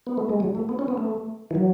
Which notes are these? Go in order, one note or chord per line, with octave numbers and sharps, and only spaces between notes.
B3
A3
G#3
F#3
A3
B3
C#4
B3
A3
E3
F#3